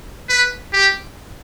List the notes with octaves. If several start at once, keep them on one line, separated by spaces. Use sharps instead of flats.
B4
G4